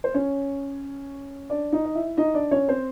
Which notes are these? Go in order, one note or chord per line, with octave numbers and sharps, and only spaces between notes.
C5
C#4 C#5
D4 D5
D#4 D#5
D#5
E4 E5
D#4 D#5
D4 D5
C#4 C#5
C4 C5